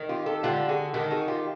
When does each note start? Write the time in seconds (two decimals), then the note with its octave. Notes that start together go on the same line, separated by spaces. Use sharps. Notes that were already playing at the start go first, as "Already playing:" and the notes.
Already playing: D#3
0.09 F4 G4
0.26 G4 A4
0.43 D3 F4 G4
0.68 F#4 G#4
0.93 D#3 G4 A4
1.11 F#4 G#4
1.28 F4 G4